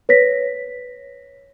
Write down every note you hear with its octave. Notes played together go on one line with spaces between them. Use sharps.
B4 C#5 A#6 B6